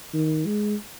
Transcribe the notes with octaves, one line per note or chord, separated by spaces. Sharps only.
D#3
G#3